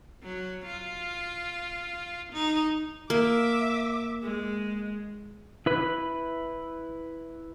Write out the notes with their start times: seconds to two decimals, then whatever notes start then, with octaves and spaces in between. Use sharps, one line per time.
0.23 F#3
0.66 F4
2.33 D#4
3.10 A#3 E5 D6
4.23 G#3
5.66 E4 B4